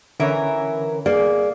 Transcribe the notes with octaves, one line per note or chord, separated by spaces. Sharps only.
D3 E3 C#4 A#4 C#5 E5
A#3 G#4 D5